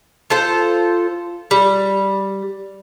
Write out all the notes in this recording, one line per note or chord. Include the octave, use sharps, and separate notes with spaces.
F4 A4 C5
G3